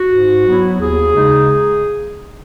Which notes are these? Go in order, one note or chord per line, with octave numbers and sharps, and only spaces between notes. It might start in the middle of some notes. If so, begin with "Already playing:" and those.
Already playing: F#4
G#2
F#3 B3 E4
D#2 G#4
C#3 G#3 D#4